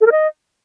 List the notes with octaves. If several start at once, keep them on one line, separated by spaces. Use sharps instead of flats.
A4
A#4
D#5